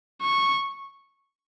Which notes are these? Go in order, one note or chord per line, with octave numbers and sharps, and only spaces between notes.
C#6